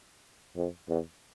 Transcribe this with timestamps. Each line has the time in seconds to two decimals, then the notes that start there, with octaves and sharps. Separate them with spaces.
0.56 F2
0.88 E2